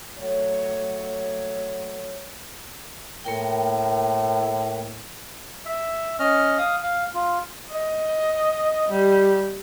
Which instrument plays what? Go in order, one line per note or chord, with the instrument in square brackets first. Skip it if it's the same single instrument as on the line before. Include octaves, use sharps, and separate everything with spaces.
[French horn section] F#3 A3 C#5
[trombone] A2 [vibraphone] A#3 A#4 G5
[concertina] E5
C#4 D#5 F6
F5 D#6
F5
F4
[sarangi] D#5
G3